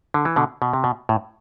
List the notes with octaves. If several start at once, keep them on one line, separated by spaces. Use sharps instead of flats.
D3
E3
B2 D3
B2
C3
B2
A2